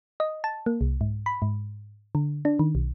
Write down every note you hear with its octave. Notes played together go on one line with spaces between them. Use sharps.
D#5
A5
A#3
C2
G#2
B5
G#2
D3
D4
D#3
B1